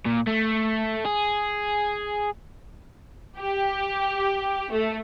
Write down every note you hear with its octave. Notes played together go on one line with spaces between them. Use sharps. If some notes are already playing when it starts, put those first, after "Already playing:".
A#2
A3
G#4
G4
A3